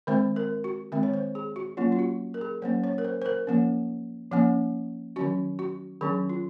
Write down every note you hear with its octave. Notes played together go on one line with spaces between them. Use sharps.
D#3 G#3 C4 C5
A#4
F#4
D#3 G#3 C4
C#5
C5
G#4
F#4
F#3 A#3 C#4 F4
F4
F#4
A#4
G#4
F#3 A#3 C#4 C5
C#5
A#4
C5
C5
A#4
F3 A#3 C#4
F3 A#3 C#4
D#3 F#3 C#4 F#4
F#4
D#3 F#3 C#4 G#4
F4